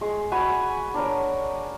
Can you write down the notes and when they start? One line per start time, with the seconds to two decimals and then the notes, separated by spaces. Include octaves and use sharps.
0.01 G#3 C#6
0.32 F#4 G#5 B5
0.94 D4 A#4 C#5